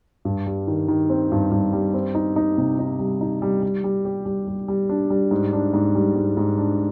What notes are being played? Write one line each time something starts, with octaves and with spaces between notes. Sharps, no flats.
G2
G3
D#3
D#3
C4
G2
G2
G3
C4
D#4
D#4
C3
D#4
G3
D#4
G3
G3
G3
G4
G3
G3
G3
D4
G3
G#2
D4
G#2
G3
G#2
G#2
D4